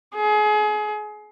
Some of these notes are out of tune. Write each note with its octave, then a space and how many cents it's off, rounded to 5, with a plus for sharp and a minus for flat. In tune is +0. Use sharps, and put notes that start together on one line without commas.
G#4 +30